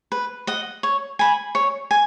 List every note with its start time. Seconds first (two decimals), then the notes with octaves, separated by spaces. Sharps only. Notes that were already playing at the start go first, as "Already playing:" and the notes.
0.12 B4
0.47 D#5 F#5
0.83 C#5
1.19 G#5 B5
1.55 C#5
1.91 G#5